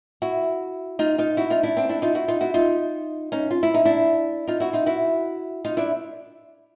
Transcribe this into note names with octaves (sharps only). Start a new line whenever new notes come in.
E4 F#4
D#4 F4
D#4 F4
E4 F#4
D#4 F4
D4 E4
C4 D4
D4 E4
D#4 F4
E4 F#4
D#4 F4
E4 F#4
D#4 F4
C#4 D#4
F4
E4
D#4
D4 E4
D#4 F4
E4 F#4
D#4 F4
E4 F#4
D#4 F4
D4 E4